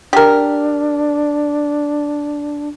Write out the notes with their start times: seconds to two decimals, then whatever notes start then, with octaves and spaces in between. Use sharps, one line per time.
0.13 D4 G4 A#4